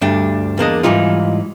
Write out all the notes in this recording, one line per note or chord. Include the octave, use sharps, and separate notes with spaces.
D2 G2 A3 D4
E2 A#3 D4 D#5
G#2 B2 E3 G3 D#4 F4